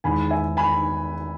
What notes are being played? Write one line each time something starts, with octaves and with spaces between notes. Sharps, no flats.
E2 D#3 G#3 G#5 B5
E5 G#5
G#5 B5